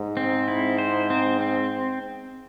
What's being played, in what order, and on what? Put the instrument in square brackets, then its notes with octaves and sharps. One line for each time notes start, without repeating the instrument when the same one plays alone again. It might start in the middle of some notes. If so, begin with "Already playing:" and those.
Already playing: [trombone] G#2
[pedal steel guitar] C4
E4
C5
C4
C4